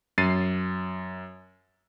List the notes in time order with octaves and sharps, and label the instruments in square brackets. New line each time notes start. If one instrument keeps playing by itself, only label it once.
[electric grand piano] F#2 A6 C7 D#7